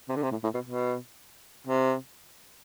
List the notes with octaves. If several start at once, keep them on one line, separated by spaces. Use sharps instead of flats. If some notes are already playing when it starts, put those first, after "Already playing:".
C3
D3
C3
A2
A2
B2
B2
C3